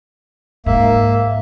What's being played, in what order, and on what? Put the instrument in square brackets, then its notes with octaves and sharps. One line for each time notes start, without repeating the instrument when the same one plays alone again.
[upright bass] G#2 [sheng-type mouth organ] A#3 E5